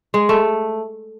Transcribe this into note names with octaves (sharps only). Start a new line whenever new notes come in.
G#3
A3